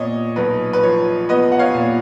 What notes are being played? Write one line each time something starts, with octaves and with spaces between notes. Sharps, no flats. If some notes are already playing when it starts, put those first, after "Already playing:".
Already playing: A#2 B3 C#5 D#5
B1 B4
B4
F3 C#5
B3 B4 D#5
F#5
C#5 F5
A#2